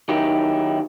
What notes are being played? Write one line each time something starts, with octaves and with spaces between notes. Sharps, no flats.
D#3 F#3 D#4 E4 G4